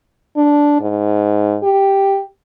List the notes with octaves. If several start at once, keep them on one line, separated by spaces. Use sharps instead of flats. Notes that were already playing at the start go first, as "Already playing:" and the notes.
D4
G#2
G4